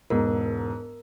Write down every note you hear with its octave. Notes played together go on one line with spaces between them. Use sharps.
E1 E2 G#2 A#4